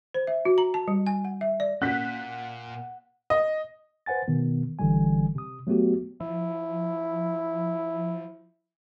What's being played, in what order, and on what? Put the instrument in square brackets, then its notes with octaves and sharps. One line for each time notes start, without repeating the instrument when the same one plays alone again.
[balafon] C5
E5
F#4
A#5
A5
G3
G#5
F#5
E5
D5
[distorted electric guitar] A#2 [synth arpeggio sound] C#4 [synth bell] F#5 [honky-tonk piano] F#6 B6
[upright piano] D#5
[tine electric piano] B4 C5 F#5 G#5 A6
B2 D#3 B3
G#1 D3 E3 G3 G#5
C3 D#6
F#3 A3 B3 F#4 G4
[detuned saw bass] F3 [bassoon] E4